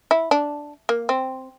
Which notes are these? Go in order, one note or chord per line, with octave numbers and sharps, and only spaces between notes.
E4
D4
A#3
C4